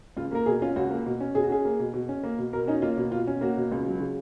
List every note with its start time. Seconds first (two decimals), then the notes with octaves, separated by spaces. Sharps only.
0.17 C#2 F4
0.31 A#3 A#4
0.46 B2 G#4
0.62 C#4 F4
0.76 C#2 F#4
0.91 A#3
1.06 B2
1.20 C#4
1.35 B2 G#4
1.43 F#4
1.50 C#4 G#4
1.65 A#3
1.80 B2
1.94 B2
2.09 C#4
2.23 A#3
2.38 B2
2.53 B2 A#4
2.68 C#4 D#4
2.82 A#3 F4
2.97 B2
3.12 B2 F4
3.27 C#4
3.41 A#3 F#4
3.57 B2
3.71 C#2
3.86 F#3
4.00 C#3